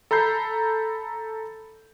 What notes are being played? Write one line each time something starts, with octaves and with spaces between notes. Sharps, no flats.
A4 A#5 B5 G6 C7